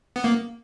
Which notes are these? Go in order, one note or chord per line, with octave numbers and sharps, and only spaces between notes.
B3
A#3